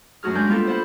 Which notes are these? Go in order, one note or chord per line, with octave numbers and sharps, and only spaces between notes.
F#2 A3 F#4 G#4 F6
G#3 D4 A#4 D5 G#5 G6
G3 A#3 B3 F4 G4 A4
C5 D5 F#5 B5